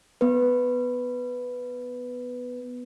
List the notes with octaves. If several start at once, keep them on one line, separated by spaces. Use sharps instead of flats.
B3 B4